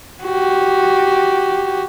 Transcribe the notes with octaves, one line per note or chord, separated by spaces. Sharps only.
F#4 G4